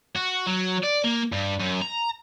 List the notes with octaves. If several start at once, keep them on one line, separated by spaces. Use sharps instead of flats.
F#4
F#3
D5
A#3
G2
F#2
A#5